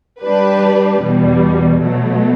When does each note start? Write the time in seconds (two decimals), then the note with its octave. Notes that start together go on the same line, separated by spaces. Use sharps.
0.21 G3 D4 G4 B4
1.00 E2 B2 G3
1.80 B2 F#3 A3